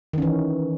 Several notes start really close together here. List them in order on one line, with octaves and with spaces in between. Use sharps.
D#3 C#4 E3